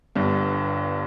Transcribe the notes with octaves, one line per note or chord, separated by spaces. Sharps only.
G1 G2